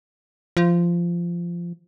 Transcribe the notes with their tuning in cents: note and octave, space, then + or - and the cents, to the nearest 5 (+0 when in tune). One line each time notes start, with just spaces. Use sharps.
F3 -15